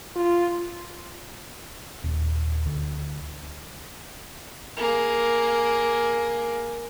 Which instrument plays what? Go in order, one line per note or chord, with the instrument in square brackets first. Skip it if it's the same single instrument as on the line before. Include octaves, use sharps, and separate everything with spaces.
[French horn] F4
[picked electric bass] D#1
D2
[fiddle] A#3 G#4